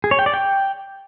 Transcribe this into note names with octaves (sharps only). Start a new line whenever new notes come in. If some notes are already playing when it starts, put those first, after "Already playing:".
G#4
C#5
G5
D5
G5